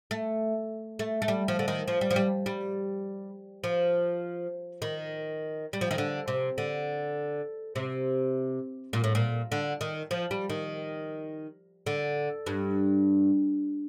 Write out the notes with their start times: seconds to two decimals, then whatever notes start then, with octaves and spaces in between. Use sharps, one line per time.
0.11 A3
0.99 A3
1.22 A3
1.28 G3
1.48 F3
1.59 D3
1.68 D#3
1.88 F3
2.01 G3
2.11 F3
2.16 G3
2.46 G3
3.64 F3
4.82 D#3
5.73 G3
5.81 F3
5.91 D#3
5.98 D3
6.28 C3
6.58 D3
7.75 C3
8.93 A#2
9.04 A2
9.15 A#2
9.52 D3
9.81 D#3
10.11 F3
10.31 G3
10.50 D#3
11.86 D3
12.46 G2